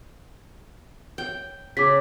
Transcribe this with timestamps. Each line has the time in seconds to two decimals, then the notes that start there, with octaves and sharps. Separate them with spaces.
1.18 G5
1.77 C#3 D6 B6